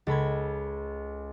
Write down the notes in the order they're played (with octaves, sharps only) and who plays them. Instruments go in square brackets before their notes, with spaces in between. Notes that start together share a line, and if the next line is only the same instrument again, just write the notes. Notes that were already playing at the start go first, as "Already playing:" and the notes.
[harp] C#2 A4 B5 G#6